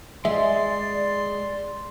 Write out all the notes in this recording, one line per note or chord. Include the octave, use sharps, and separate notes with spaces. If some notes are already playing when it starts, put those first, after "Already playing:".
G#3 D5 E5 C6